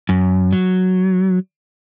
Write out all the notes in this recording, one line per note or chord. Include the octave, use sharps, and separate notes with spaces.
F#2
F#3